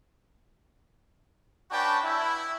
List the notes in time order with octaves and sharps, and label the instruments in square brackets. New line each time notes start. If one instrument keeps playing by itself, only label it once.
[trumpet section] C#4 D4 F#4 B4 G5 A5
E4